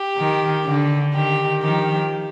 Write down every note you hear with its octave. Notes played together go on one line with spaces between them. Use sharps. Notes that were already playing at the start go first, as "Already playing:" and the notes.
Already playing: G4
D#3
D3
D#3 G4
D#3 F3 G4